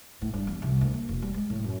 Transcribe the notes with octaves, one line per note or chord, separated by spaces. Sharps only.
A2
G2
E2
C2
D2
A#3
E1
G3
G#3
A2
F#2